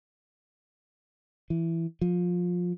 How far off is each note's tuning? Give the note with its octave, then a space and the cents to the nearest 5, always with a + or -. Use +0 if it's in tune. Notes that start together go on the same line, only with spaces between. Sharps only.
E3 +10
F3 +20